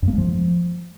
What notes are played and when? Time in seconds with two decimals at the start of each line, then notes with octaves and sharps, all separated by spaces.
0.02 F#2
0.08 A#3
0.13 G#3
0.18 F3